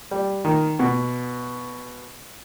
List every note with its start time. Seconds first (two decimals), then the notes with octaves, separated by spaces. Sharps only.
0.11 G3
0.45 D#3
0.79 B2